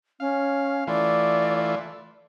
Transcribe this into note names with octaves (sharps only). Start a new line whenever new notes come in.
C#4 F5
E3 A3 F4 D5